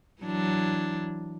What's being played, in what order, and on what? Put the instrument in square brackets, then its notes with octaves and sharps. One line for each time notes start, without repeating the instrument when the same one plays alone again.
[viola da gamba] E3 F#3 D4